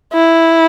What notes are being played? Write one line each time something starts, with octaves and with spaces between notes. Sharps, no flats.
E4